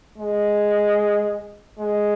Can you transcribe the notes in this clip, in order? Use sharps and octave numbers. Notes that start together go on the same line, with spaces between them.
G#3
G#3